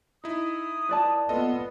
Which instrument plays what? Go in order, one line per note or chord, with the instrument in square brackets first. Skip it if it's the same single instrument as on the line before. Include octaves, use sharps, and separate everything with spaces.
[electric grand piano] D#4 E4 [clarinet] D#6
[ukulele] B4 D5 A5
[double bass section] B3 [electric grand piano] F4 A4 D#5